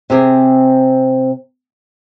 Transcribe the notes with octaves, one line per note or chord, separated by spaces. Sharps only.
C3 C4 G4 G#4